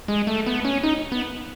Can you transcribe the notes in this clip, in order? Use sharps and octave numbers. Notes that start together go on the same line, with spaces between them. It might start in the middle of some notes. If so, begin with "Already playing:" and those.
G#3
A3
B3
C#4
D#4
B3